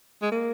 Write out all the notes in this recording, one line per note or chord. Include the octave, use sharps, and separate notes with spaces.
G#3
A#3